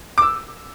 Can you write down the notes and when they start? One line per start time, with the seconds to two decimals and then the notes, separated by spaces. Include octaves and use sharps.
0.18 D6
0.22 E6